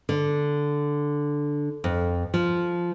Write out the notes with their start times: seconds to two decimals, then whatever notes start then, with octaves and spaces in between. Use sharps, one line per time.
0.09 D3
1.84 F2
2.34 F3